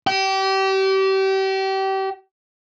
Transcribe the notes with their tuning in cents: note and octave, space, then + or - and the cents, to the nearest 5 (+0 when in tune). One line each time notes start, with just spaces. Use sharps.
G4 -30